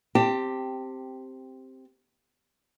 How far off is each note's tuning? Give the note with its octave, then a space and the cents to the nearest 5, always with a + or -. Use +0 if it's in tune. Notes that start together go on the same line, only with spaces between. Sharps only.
C4 +0 G4 +0 A5 +25